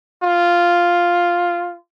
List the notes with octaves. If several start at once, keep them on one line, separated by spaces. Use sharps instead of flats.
F4